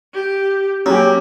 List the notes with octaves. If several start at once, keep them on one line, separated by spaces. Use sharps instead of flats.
G4
F#3 A#3 C#4 G4